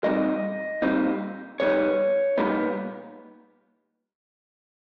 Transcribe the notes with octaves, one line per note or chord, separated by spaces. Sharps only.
A#2 G3 C4 D#4 D#5
A#2 G3 C4 D#4
C2 A#2 G3 B3 D#4 C#5
C2 A#2 G3 B3 D#4